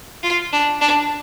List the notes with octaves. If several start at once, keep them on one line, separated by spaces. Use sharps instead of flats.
F4
D4
D4